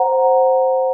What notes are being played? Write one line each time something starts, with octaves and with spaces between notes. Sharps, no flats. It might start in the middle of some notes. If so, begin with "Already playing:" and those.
Already playing: C5 F#5 A#5